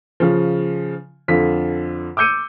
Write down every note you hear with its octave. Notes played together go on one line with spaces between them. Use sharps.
C#3 F3
F2 D3 F4 B6
D6 E6 G6 C#7 D#7